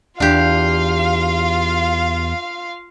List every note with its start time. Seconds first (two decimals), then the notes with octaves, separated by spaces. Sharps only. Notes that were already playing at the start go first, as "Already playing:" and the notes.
0.20 E2 D4 F4 G4 F5